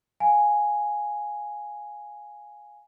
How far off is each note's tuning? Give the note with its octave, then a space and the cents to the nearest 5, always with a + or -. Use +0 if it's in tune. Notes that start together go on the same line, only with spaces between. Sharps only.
F5 +20 G#5 +0